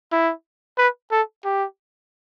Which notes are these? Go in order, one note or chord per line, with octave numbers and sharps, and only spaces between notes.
E4
B4
A4
G4